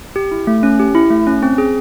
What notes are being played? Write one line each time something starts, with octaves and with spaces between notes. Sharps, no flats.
G4
E4
A3
C#4
G4
E4
A3
C#4
C4
G#4